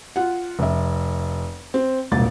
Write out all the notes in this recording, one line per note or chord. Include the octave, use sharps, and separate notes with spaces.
F4 F#5
F1 E5
C4
E1 C2 A#2 A6